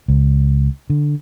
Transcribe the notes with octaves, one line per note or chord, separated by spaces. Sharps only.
C#2
D3